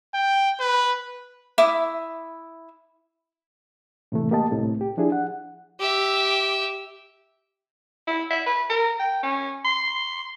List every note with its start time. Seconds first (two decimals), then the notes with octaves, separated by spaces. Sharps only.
0.14 G5
0.60 B4
1.58 E4 E5 D6 D#6
4.12 A2 C3 E3 A3
4.31 A#3 G4 D#5 A5
4.51 C2 A2 C4
4.81 G4
4.97 F3 D4 E4 G#4
5.12 F#5
5.80 G4 E5
8.07 E4
8.30 E5
8.46 B4
8.70 A#4
8.99 G5
9.23 C#4
9.65 C6